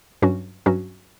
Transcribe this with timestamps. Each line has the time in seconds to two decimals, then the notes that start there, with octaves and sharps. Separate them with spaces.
0.22 G2 F#3 C#4 F#4
0.66 G2 F#3 C#4 F#4